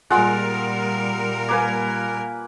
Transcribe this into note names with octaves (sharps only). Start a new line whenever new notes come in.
A#2 G3 G#3 F4 A#4 F#5
A#3 B4 G#5